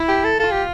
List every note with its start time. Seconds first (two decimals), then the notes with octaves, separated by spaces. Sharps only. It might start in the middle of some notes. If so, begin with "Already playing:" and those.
Already playing: E4
0.08 G4
0.24 A4
0.40 F4 A4
0.51 G4